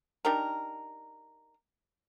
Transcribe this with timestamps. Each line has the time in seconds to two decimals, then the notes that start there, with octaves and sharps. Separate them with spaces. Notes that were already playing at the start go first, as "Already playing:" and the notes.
0.25 D4 D#4 G4 A#4